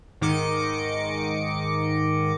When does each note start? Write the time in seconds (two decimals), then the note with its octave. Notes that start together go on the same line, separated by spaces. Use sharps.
0.21 G#2 D#3 D#5 D6 C#7